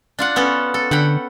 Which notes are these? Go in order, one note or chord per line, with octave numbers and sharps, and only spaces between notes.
D4 F4 F#5
B3 C#4 A4
A4
D3 F#5 G5 B5